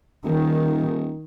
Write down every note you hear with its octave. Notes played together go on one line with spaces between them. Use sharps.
D#1 D#3